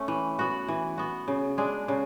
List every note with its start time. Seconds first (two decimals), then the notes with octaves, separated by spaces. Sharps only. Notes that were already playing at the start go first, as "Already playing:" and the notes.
Already playing: A3 C#4
0.08 E3
0.39 B3 F#4
0.68 E3
0.98 B3 F#4
1.28 C#3
1.58 G#3 D4 G#4
1.88 C#3